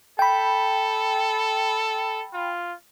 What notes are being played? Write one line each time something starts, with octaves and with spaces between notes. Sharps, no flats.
A4 G5 B5
F4